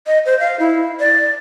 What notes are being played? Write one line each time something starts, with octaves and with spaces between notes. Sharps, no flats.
D#5
C5
F5
E4
D5